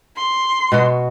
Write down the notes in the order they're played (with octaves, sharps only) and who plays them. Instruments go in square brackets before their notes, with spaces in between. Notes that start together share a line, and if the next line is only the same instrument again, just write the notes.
[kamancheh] C6
[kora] B2 B3 F#4